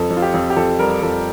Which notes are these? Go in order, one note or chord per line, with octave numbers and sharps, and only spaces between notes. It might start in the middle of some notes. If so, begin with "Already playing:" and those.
Already playing: F2 A4
F2
F4
G4
F2
G4
F2 A4
G3 A#4
F2 A4